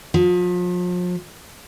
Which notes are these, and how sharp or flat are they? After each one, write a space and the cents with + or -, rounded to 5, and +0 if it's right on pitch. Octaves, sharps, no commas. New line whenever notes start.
F3 +40